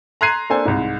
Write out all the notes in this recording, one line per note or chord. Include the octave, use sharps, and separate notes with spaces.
A#5 C6 F#6 G#6 C7 D#7
A#3 D4 A4 C5 G#5
C2 G#2